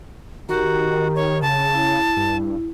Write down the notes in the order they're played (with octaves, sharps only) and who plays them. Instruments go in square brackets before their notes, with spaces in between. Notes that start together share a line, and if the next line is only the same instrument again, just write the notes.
[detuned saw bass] D#3 [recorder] F#4 [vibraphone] G4 A#4 A#5
[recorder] C#5
[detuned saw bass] C#3 [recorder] A5
[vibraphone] E4
[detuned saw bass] G2